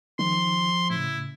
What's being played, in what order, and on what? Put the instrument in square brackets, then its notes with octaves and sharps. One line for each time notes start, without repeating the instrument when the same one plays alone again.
[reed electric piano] D#3 [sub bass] F3 [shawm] C6
[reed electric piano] A2 C#3 [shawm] E4